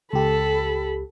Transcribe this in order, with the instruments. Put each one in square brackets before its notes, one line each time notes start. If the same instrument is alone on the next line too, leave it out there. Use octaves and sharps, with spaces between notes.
[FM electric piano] C#2 G4 [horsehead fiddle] A4 B5